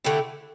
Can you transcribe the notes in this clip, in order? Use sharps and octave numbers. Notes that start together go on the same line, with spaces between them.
D3 A3 E4 G4